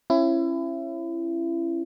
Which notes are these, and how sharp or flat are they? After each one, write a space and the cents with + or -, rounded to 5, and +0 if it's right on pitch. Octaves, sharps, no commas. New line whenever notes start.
C#4 -30 E4 +30